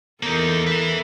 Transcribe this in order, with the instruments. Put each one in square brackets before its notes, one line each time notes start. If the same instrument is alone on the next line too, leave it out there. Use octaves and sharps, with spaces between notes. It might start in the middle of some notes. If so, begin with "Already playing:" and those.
[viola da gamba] E2 A4 A#4 [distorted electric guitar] A#3 D#4
[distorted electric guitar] B4 E5